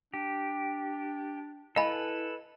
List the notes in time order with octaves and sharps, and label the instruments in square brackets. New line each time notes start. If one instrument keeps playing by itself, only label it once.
[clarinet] D4 [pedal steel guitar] G4
[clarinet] E4 [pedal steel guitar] A4 B4 [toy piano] D#5 G#5 [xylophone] F5 B5